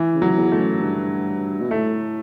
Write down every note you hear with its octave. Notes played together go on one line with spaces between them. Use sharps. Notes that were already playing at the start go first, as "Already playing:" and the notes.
Already playing: E3
C#3
F#3
E2
A3
F#2
G2
B2
A2 A3